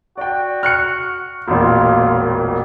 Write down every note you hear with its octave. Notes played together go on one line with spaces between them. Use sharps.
F#4 D5 G5
F6 F#6 C#7
E1 A1 A#2 F4